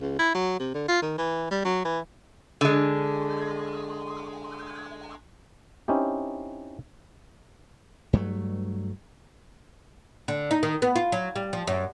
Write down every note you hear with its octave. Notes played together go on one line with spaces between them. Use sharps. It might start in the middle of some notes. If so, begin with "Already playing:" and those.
C#2
E4
F#3
C3
D3
F4
D#3
E3
G3
F#3
E3
D3 G#3
C4 C#4 D#4 E4 G4
G2 F#3 A3
D3
D#4
D#3
B3
F4
F#3
G3
F3
F#2